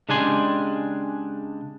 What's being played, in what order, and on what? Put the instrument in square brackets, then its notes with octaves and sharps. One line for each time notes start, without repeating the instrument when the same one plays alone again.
[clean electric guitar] C#3 G#3 D4 G4 G#5 C6